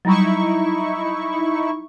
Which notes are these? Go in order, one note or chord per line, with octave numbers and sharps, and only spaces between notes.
F#3 G3 D#4 E4 C#6